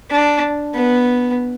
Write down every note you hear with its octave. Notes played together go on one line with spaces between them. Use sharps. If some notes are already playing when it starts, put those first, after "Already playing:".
D4
B3